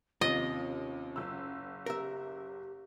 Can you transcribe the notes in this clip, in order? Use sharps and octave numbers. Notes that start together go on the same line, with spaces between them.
D#2 C3 C#4 F4 D#5
F#1 E6
G4 A#4 E5